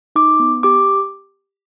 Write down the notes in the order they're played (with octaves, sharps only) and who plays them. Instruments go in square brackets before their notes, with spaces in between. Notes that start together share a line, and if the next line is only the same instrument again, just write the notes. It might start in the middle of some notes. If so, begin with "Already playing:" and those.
[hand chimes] D#4 D6
B3
G4 D6